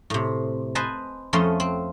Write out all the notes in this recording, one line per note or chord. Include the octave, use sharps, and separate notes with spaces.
A2 C3
B4 C5 D#5 G#5 A5
F2 F3 A3 C#4 D#5 C6
C4